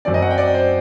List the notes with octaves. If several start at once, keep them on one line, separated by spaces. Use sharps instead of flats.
F#2 F#3 C4 D5
D#5
F#5
G5
D5
C5